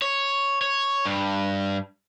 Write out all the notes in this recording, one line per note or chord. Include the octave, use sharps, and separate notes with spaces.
C#5
C#5
G2